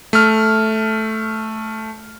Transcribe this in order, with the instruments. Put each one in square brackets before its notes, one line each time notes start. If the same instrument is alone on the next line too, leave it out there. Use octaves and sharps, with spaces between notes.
[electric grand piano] A3 F6